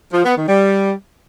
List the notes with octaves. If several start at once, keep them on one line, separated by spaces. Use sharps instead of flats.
F3
B3
D#3
G3